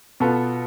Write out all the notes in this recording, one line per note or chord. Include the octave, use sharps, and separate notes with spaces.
B2 B3 F4 A4